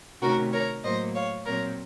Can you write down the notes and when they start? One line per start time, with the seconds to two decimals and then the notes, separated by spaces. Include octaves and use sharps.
0.22 C3 D#3 A3 C#4 F#4 A#4
0.53 A#4 C#5
0.83 A2 F#3 A#3 C5 D#5
1.15 C#5 F5
1.45 A#2 F#3 C4 A#4 C#5